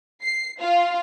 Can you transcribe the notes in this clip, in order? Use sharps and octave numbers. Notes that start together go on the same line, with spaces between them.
C7
F4